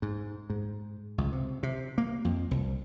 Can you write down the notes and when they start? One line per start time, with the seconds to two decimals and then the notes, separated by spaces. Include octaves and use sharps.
0.02 G#2
0.50 G#2
1.18 C#2
1.32 C3
1.63 C3
1.98 A#3
2.25 F2
2.51 C2